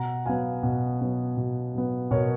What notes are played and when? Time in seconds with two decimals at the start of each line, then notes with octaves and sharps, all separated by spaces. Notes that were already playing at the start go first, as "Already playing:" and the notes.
Already playing: B2 F#5 A#5
0.26 F#3 B3 F5 G#5
0.63 B2
1.01 F#3 B3
1.37 B2
1.74 F#3 B3
2.11 B2 A#4 C#5